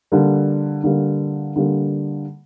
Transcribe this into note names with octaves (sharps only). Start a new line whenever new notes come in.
D3 G3 A#3
D3 G3 A#3
D3 G3 A#3